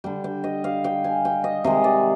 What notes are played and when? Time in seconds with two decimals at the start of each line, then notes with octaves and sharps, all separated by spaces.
0.04 D3 G3 G5
0.24 G5
0.44 D#5
0.64 F5
0.84 G5
1.04 G#5
1.25 G5
1.44 D#5
1.64 C3 D#3 G#3 D#5
1.84 D5